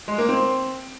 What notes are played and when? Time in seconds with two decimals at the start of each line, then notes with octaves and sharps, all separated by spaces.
0.08 G#3
0.18 A#3
0.29 C4